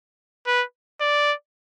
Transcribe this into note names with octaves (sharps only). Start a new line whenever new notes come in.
B4
D5